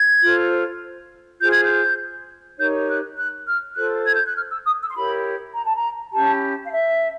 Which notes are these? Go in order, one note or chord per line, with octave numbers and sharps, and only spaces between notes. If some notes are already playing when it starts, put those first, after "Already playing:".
Already playing: G#6
F4 A4 C5
F4 G#4 C5 G6
G#6
G6
D#4 G4 A#4 C#5 G6
F#6
F#6
F6
F4 A4 C5 F#6
G#6
G6
F#6
F6
E6
D#6
E6
C6
E4 G4 A#4 C#5 B5
A#5
A5
A#5
C#4 E4 G4 A5
F5
E5